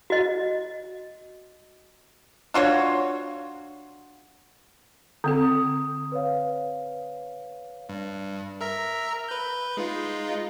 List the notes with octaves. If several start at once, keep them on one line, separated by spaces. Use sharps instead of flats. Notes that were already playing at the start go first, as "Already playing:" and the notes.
F#4 D#5
D4 F4 F#4 C#5
D3 C4 A4 D#6
B4 C#5 F5
G2
A#4 E5 A#5
B4 G6
G#3 D#4 F4